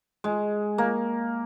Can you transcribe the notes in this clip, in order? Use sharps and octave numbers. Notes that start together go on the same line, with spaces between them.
G#3
A#3